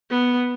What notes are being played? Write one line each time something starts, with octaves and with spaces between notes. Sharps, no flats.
B3